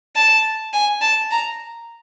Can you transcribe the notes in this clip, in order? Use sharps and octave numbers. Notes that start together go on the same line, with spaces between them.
A5
G#5
A5
A#5